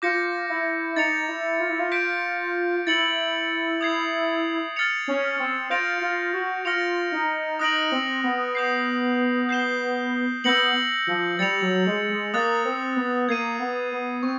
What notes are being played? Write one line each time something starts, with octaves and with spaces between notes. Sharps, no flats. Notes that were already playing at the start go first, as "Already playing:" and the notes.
F4 D6 G6 A#6 C#7
E4
D#4 A6 C#7 F7
E4
F4
E4
F4
G6 B6 D7
E4 A6 C#7 F#7
D#6 G#6 C7
F6 A6 C#7 F7
C#4
C4
F4 G6 A#6 D7 F7
F4
F#4
F4 F6 A#6 C#7 F7
D#4
D#4 D#6 F#6 A#6 D7 F#7
C4
B3
D#6 G6 C7
G6 C7 E7 G7
B3 E6 G6 A#6 C#7 F#7
F3
G3 A6 C#7 F7
F#3
G#3
G#3
A#3 D#6 F#6 A6
C4
B3
A#3 G#6 C7 D#7
B3
B3
C4 C#6